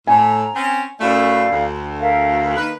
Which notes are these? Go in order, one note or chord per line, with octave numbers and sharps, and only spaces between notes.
A2 G#5 A#5
C4 C#4
F#2 A3 E4 D5 F5
D2
A#4 E5 F5
D#3 A#3 B4